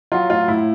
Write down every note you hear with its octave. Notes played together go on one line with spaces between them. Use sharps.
F#3 F4
A2 F4
A2 E4